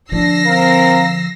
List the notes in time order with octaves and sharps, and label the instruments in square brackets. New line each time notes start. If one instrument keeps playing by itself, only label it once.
[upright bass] D3 F3 [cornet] D4 [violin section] E6 A#6 C7
[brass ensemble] C4 A#4 [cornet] F5